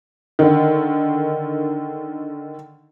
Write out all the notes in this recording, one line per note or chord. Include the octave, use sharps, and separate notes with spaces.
D3 D#3